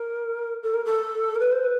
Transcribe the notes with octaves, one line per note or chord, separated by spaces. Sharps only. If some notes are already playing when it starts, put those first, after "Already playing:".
Already playing: A#4
A4
A#4
A4
A#4
B4
C5
B4